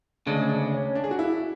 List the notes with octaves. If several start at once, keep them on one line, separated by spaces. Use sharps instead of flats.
D2 C#3 G#3 D4
D4
C#4
D4
G#4
F#4
E4